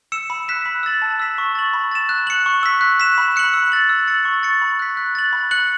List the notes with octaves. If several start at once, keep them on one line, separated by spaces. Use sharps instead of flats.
E6 C#7 E7
B5
F#6 B6 E7
B5
E6 A6 F#7
A5
E6 B6 E7
C#6
A6 F#7
B5
A6 E7
F#6
C#7 F#7
C#6
E6 B6
F#6
B6 E7
B5
F#6 C#7 F#7
E6
A6 F#7
E6
A6 C#7 F#7
C#6
A6 C#7
B5
F#6 B6
F#6
A6 F#7
B5
F#6 C#7 F#7